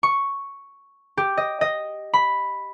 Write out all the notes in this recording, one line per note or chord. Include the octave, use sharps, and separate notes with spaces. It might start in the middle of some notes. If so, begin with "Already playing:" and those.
C#6
G4
D#5
D#5
B5